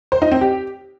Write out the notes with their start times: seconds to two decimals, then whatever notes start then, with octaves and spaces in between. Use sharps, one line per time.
0.12 C5
0.22 D#4
0.32 C4
0.41 G4